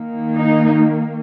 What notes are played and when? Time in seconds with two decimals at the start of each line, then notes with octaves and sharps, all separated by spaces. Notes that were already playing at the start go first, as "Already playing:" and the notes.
Already playing: D#3 A#3
0.36 D#4